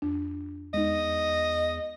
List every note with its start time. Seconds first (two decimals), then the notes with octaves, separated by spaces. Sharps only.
0.02 F2 D4
0.74 E2 G#3 D#4 D#5